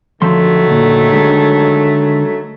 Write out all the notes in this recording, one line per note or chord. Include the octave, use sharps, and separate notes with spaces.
D2 D#3 F3 F#3 A3 C6
D2 A#2
D3 G#3